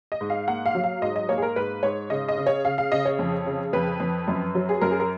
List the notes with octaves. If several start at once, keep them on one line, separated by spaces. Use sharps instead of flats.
D#5
G#2
F5
A#3 F#5
F5
F#3
F5
G#2 D#5
D#5
A#3 C#5
G#4
A#4
G#2 B4
G#2 C#5
C#3 D#5
D#5
C#3
C#5
C#3 F5
F5
C#3 D#5
C#5
F2
C#3
F2 B4
F2
F#2
F#3
G#4
F#2 A#4
G#4
A#4